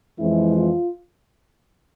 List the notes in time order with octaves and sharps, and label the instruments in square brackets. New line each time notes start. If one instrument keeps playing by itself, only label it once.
[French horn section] F2 E3 G#3 C4 E4
F4